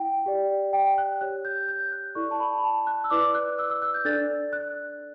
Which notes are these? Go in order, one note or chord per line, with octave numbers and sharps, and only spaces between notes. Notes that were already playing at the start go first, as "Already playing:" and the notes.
Already playing: E4 F#5 G5
G4 D5
G5
F#6
G4 C#5 F#6
G6
G6
F#6
E4 A4 D5 C#6
A5
B5
B5
A5
F#6
E6
E4 B4 D5 D6
F#6
E6
E6
F#6
G6
D4 A4 D5 A6
F#6